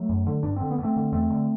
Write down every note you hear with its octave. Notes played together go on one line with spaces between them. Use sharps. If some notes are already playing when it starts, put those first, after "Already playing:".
Already playing: F#3 A3
F#2
D3
G2 D4
D3 C4
B3
G2
A3 C4
D3
E2 A3 C4
D3